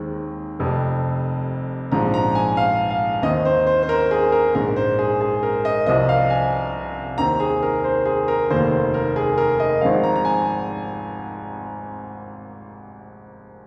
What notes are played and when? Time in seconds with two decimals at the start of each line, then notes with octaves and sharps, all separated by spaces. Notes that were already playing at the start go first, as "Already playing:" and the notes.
Already playing: D#2 D#3 G#3 C4
0.59 F1 F2 C3
1.91 A#1 G#2 F3 C4 A#5
2.14 A#5
2.35 G#5
2.57 F5
2.91 F5
3.23 D#2 D#3 C4 D#5
3.45 C5
3.67 C5
3.83 C5
3.89 A#4
4.11 G#4
4.32 A#4
4.54 A#1 G#2 G#3 A#4
4.76 C5
4.99 G#4
5.21 G#4
5.43 A#4
5.65 D#5
5.86 C2 C3 F3 C4 D#5
6.09 F5
6.30 G#5
7.18 D#2 D#3 C4 A#5
7.40 G#4
7.63 A#4
7.84 C5
8.06 G#4
8.28 A#4
8.50 F1 D#2 D#3 A#3 C5
8.71 C5
8.94 A#4
9.16 G#4
9.38 A#4
9.60 D#5
9.81 G#1 G#2 F3 C4 F5
10.04 A#5
10.16 A#5
10.25 G#5